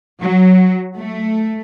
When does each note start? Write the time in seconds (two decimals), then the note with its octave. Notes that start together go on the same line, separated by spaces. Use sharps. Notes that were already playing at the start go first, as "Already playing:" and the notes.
0.21 F#3
0.96 A3